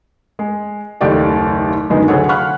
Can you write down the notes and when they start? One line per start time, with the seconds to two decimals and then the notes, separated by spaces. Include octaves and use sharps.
0.39 G#3
1.01 F#1 D#2 A3 G4 D5 D#5
1.90 F#2 D3 D#3 G#3 B3 D#4
2.08 F#1 D2 G#4 A4 C#5 F#5
2.29 F5 F#5 B5 C#6 F6 F#6